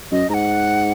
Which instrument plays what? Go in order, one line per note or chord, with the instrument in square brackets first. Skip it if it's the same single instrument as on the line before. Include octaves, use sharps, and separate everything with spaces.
[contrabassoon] F#2 [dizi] D#5
[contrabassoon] G#2 [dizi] A#5
[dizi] F#5